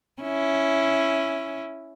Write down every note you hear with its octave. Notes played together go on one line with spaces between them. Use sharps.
C#4 E4